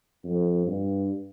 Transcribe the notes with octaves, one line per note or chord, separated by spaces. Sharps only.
F2
G2